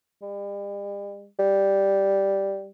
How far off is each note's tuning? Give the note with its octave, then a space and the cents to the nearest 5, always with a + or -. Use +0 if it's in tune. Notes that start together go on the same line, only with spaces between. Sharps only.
G3 +45
G3 +0